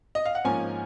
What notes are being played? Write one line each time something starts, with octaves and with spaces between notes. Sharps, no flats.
D#5
F5
F#5
G#2 F3 A#3 C#4 G#5